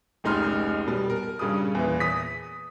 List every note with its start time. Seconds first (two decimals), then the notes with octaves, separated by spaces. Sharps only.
0.24 F1 C#2 D#4 C6 F6
0.87 B2 G3
1.10 A#4
1.39 G2 C#3 G3 G#4 D#6
1.75 E2 A#2 E3
2.00 D#6 B6